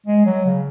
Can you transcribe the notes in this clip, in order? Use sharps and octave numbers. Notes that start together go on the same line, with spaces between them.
G#3
F#3
C#3